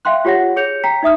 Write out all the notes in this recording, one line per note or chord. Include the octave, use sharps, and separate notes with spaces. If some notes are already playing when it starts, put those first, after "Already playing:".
E5 F5 G5 C6 F#6
F4 G4 C#5 F#5 A#6
G#4 C#5 G6 C#7 F7
G5 A#5 B6
D#4 E5 D#6 F6